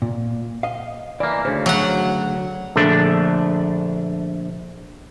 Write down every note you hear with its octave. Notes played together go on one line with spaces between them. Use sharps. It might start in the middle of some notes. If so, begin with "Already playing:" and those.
A#2
D#5 F5
E3 A#3 D5
D2 C#3 C5
F#3 F#5
A#1 D3 A3 D4